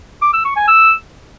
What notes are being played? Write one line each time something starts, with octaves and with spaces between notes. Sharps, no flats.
D6
E6
C#6
G#5
E6